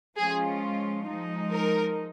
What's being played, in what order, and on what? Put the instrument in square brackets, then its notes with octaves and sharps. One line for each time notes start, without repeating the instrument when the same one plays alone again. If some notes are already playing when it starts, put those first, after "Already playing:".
[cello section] F3 G#3 C#4 F4 [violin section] G#4
[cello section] F3 G#3 D#4
[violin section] A#4